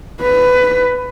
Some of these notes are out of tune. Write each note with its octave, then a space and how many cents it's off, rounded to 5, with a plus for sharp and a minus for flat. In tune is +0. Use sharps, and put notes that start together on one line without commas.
B4 +15